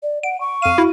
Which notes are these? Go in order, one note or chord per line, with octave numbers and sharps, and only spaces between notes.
D5
F#5 D7
C#6
F2 F5 D#7
E4 F#4